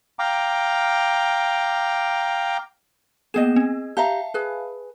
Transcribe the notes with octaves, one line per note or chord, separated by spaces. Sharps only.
F5 G5 A#5 D6
A#3 B3 G#4 D#5 E7
C4
G4 E5 F5 A5 A#5
G#4 B4